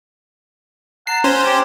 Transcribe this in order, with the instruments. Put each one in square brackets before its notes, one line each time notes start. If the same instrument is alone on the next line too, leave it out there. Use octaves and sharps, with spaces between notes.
[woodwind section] F#5 A5 A#5 [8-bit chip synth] C7
[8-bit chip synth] C#4 C5
[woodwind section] G4